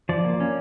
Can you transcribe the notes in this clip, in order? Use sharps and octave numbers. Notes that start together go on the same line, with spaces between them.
F3 D5
A#3
C#4